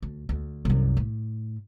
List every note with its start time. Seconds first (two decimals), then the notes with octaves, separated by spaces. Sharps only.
0.02 D2
0.29 D2
0.65 C2 F#2
0.97 A2